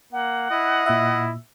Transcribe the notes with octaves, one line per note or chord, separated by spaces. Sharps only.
A#3 F#5
E4 D#5
A#2 E4 E5